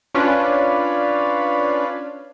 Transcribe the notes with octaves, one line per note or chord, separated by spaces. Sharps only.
C#4 D4 F4 B4